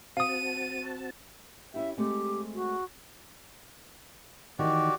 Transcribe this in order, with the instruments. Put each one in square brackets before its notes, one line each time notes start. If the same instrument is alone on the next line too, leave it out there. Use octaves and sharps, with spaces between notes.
[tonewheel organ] C4 F#4 A5 [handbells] F5 D#6 [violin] D#7
[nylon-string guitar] C#4 E4 G4 [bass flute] E5
[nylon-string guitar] G#3 A3 C4 [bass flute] G4
[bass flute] F#4
[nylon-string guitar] D#3 E3 [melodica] F#4 G4 D5